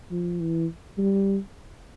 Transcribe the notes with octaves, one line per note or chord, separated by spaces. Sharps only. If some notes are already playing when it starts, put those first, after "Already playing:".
F3
E3
G3